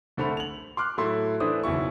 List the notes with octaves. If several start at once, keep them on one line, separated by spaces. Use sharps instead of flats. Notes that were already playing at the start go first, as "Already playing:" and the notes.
C2 D3 A3 C5 B5 F7
F7 F#7
C6 D6 F6 F#6
A2 F#3 A3 E4 C6
E3 A3 D4 E4 C5 D#6
F#1 B1 B2 E4 C#6